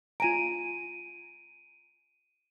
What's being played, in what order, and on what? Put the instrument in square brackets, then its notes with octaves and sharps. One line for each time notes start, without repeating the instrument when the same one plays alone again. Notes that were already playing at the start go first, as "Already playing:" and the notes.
[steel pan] F4 G#5 A#5 [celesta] D7 D#7